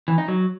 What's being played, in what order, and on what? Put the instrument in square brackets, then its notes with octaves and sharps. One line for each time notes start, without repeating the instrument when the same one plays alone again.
[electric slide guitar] E3
D#4
F#3